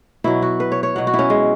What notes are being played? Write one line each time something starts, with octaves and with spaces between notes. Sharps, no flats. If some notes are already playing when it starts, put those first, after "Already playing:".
B2 F#3 E4
F#4
B4
C#5
C#5
B2 F#3 F#5
F#4
E4
C#4
G#3